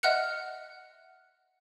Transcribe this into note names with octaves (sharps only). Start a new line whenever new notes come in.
D#5 E5 F#5 F6 F#6 C#7